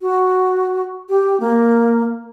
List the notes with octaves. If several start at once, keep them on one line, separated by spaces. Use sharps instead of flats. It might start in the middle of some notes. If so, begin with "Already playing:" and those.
F#4
G4
A#3